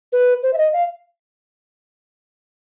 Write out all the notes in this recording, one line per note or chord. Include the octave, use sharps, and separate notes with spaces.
B4
C5
E5
D#5
F5